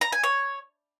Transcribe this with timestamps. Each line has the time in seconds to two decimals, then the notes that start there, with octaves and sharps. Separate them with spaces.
0.01 A#5
0.12 G#5
0.24 C#5